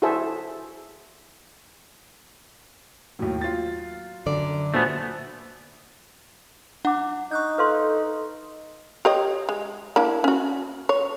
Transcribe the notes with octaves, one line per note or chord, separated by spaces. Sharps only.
E4 F#4 G#4 A4 C5 E5
D#2 A2 F#3
F4 A6
F#2 D3 D5
A#2 A3 B3 F#4 C5 G#5
D4 F#5 D6
D#4 C#6 F#6 G6
A4 B4 F5 C6
G4 C#5 D#5
G#3
A#3 D4 E4
C#4 F#4
C#5